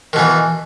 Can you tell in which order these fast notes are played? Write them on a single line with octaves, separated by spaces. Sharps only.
D#3 B2 E3